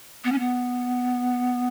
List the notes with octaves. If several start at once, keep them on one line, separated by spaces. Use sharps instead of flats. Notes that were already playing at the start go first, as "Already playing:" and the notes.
B3
C#4
B3